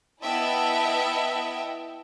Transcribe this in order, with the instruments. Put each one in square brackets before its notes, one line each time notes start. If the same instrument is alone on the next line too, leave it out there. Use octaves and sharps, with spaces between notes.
[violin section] B3 E4 D#5 E5 G5 A5